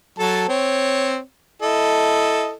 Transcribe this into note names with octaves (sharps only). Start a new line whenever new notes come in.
F#3 A4 A5
C4 C#5
E4 A4 D#5